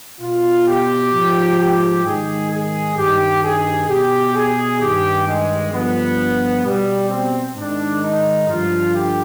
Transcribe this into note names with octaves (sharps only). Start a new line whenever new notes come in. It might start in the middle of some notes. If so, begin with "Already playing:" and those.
B2 F4
G4
G#2 F3
G4
G#2 D#3 G#4
G#4
G2 D#3 G4
G#4
B2 G4
G#4
G2 D#3 G4
G#3
G2 D3 F3 B3
B2 G3
C4
G#2 D#3 D4
D#4
G2 D3 F3 F4
G4